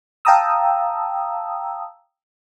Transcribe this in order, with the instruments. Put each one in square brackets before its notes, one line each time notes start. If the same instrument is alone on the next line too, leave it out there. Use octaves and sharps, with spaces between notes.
[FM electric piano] F5 G5 A5 A#5 D#6 E6